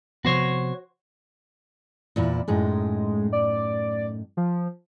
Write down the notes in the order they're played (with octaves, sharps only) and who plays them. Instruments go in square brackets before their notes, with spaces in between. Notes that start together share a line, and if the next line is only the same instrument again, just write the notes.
[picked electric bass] C3 F3 B3 [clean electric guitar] F#4 C5 C#5
[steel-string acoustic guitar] E2 A#2 E4
[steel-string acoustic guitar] F#2 A2 D#4 [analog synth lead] G#3
[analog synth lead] D5
F3